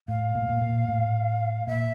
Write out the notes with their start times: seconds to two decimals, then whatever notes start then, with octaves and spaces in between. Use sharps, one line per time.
0.08 A2 F5
0.35 A#2
0.42 A2
0.49 A#2
0.61 A#2
0.88 A2
1.67 A#2 E5